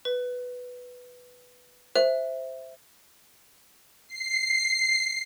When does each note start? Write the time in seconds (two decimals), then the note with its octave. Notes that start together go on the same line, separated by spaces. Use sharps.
0.05 B4
1.96 C5 E5
4.07 C7